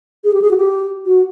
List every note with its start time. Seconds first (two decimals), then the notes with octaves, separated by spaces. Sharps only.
0.24 G#4
0.33 G4
0.42 G#4
0.51 F#4
0.57 G4
1.06 F#4